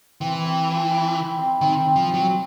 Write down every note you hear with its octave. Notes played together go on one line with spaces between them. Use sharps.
E3 C4
C4
C4
E4
C4
C4
D#3 C4
C4
F3
C4
F#3